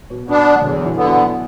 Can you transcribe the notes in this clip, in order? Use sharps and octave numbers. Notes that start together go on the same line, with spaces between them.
B2
B2 B3 D4
E2 D3 F#3
B2 E3
D3 B3
B2 E3